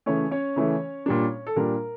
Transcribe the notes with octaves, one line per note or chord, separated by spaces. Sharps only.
C#3 E3 A3 C#4 C#5
C#4 C#5
C#3 E3 A3
A#2 G3 D4
A4
A#2 G3 D4 A#4